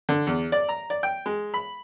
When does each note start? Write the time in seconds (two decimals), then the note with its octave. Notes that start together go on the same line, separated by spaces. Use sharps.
0.09 D3
0.27 E2
0.52 D5
0.69 A#5
0.90 D5
1.03 G5
1.26 G#3
1.54 B5